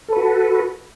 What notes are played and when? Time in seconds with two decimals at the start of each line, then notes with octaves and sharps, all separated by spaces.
0.08 A4
0.12 B4
0.16 F#4